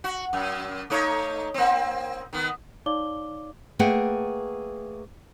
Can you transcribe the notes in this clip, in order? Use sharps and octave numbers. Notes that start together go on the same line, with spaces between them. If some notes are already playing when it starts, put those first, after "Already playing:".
F#4
F#2
A3 D#4 C#5
A#3 C4
D#3 B3
D#4 C#5 D5 F5 D6 G7
A3 A#3 G#4 B4 F#5 G5